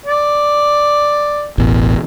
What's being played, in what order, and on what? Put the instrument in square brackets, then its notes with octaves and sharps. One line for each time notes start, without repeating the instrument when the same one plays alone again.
[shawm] D5
[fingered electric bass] E1 A1 E2